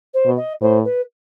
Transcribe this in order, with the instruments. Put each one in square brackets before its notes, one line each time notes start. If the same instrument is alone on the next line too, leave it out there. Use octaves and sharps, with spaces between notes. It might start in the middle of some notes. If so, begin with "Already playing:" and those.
[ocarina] C5
[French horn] B2
[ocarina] D#5
[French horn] A2 [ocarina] C5
[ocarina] B4